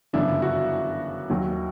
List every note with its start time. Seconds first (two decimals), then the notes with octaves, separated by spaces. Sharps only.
0.13 G1 F#2 C#3 D4 E4
0.42 E4 F#4
1.30 D#2 D#3 F#3